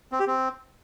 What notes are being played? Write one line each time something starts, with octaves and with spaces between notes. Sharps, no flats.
C4
G4
C4